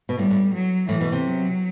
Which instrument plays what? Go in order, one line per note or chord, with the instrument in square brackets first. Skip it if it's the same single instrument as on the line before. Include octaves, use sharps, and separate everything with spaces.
[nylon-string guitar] B2
[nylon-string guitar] A2 [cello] G3
[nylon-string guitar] A2
[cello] F#3
[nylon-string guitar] A2 [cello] E3
[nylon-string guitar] B2
C3
[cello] F#3